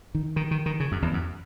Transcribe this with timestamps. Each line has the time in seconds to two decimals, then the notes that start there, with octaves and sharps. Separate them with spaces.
0.15 D#3
0.36 D#3
0.51 D#3
0.66 D#3
0.80 C#3
0.92 F#2
1.02 E2
1.13 F#2